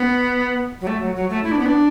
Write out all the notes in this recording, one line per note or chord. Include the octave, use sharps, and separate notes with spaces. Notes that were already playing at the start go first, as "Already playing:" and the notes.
Already playing: B3
F#3
A3
F#3
F#3
A3
E4
D4
B3
D4